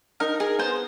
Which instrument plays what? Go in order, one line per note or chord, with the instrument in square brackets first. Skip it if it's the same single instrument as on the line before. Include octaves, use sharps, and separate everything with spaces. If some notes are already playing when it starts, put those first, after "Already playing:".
[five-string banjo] D#4 [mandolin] A#4
[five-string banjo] G#4 [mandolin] A#4
[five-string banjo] B3 [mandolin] C5